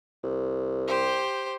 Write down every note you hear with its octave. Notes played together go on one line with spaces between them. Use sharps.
C2
G4 C5